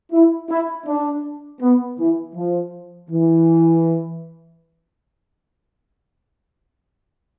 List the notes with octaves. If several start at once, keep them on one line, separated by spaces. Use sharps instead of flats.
E4
E4
D4
B3
E3
F3
E3